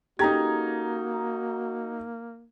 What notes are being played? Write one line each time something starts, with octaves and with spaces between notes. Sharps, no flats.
A#3 C#4 D#4 F#4 G4 A4 A#5 G#6